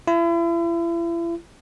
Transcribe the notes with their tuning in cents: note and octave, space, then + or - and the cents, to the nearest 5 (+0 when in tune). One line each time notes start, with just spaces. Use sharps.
E4 +40